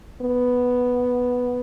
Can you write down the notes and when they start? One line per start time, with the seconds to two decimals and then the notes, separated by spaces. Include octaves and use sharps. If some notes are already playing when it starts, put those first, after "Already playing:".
0.21 B3